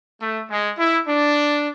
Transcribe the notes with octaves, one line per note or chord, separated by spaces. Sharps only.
A3
G#3
E4
D4